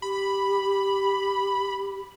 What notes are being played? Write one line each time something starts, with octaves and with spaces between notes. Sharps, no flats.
G4 B5